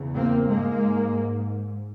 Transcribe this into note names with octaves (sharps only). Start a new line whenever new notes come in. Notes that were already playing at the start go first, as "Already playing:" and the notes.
Already playing: E2 C#3
A#3 C4
G#2 G#3 A#3